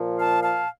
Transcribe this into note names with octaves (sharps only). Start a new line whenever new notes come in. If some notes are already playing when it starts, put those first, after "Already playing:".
Already playing: A#2 F3
F5 A5
F5 A5